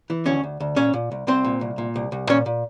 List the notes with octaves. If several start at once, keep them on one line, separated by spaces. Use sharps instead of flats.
E3
D2 C#4 C#5
D2
D2
A#2 C#4 C#5
A#2
C2
C2 C4 C5
A#2
C2
A#2
C2
C2
A#2 C#4 C#5
A#2